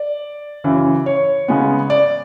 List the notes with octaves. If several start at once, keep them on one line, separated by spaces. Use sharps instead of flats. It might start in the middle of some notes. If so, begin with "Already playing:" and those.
Already playing: D5
F#2 C#3 E3
C#5
C#3 G#3 B3
D5